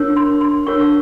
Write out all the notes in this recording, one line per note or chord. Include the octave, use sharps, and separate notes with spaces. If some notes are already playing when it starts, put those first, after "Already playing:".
Already playing: D4 F#4 A#4 C#5
C6
C6
D4 F#4 A#4 C#5 C#6